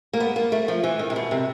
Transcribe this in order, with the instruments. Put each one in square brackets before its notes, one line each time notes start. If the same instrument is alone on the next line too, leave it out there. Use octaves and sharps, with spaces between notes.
[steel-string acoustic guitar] A#3
B3
A#3
A3
F3
E3
D#3
C3
B2
C3